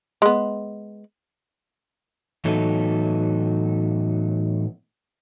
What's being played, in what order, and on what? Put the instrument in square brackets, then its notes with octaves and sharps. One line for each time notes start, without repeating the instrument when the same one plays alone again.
[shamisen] G#3 B3
[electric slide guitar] A2 E3 F#3 B3 D#4 A4